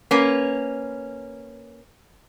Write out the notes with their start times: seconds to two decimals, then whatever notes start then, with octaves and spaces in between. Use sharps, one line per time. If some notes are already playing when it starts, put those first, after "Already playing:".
0.11 A#3 C#4 B4